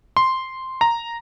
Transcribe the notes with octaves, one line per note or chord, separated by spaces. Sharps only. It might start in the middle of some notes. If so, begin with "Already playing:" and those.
C6
A#5